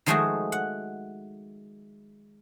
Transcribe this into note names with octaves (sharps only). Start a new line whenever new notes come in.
D#3 F3 G#3 A3 F#4 G#4
F#5